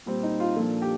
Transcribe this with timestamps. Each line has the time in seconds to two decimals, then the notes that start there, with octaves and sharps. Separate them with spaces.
0.06 A#2 G3 C4
0.23 D#4
0.40 F4
0.56 A#2 F3 A#3 D4 A4
0.82 G4